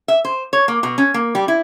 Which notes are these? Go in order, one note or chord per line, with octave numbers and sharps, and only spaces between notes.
E5
C5
C#5
A#3
B2
C#4
A#3
G3
E4